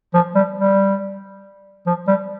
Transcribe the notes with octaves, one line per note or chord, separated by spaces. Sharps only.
F3
G3
G3
F3
G3